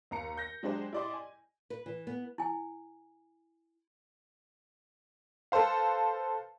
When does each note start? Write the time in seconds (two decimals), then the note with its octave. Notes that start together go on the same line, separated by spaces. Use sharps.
0.11 D#2 A#5 C#7
0.37 G6 A#6
0.63 F#3 G#3 D4 G4 G#4 C5
0.93 E4 G4 D5 D#5 C6
1.13 G#5
1.70 B4
1.86 E3
2.07 B3
2.38 E4 G#5
5.52 A4 B4 C5 F5